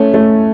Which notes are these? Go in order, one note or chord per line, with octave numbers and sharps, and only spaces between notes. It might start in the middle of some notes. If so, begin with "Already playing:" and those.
Already playing: A3 C#4
A3